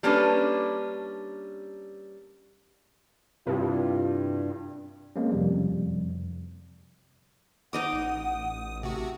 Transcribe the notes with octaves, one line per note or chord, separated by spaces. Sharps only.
G3 A#3 C#4 D4 A4 B4
G2 C3 C4 E4 F4
F#3 G#3 A#3 C4 C#4
F2 C3 F3 G3
D#4 D#5 F#5 D6 D#6
A1
C3 A3 F#4